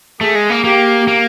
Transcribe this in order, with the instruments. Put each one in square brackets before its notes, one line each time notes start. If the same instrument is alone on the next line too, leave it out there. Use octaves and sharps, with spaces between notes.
[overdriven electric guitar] A3 [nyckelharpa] G#4
[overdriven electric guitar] G#3
A#3
[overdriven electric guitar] A#3 [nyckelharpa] G4
[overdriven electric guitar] A#3